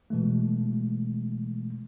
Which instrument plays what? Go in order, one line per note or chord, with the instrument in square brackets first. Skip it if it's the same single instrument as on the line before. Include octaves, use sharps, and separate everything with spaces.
[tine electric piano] B2 E3 G#3 A3